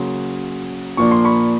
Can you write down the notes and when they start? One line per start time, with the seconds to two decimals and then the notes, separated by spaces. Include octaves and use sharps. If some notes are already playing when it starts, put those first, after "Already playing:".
Already playing: C#3 F#3 A#3 C6
0.97 A#2 F3 A#3 D4 C#6
1.12 C6
1.25 B5 C#6